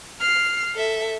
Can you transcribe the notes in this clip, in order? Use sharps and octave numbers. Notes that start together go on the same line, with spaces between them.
F6 C7
A4 E5